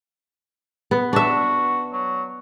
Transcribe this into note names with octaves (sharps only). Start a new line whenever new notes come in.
B3
D4 F#4 E5
F#3